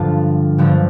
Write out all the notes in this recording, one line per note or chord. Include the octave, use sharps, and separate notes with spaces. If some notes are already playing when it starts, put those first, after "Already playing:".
Already playing: G2 D3 F3 F4 A4
G2 D3 F3